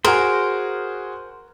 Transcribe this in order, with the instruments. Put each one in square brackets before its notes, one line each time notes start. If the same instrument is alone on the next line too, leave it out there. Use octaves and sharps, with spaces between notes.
[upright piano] F#4 G#4 [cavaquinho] A#4 [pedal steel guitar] C5